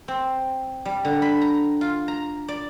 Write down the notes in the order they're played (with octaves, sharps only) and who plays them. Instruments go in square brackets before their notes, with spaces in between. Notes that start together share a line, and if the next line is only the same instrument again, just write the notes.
[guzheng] C4
G3
D3
B5
A#5
F4
A#5
D5